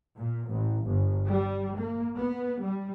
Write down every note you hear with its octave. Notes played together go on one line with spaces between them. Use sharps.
A#2
A1
G1
G3
A#3
B3
G3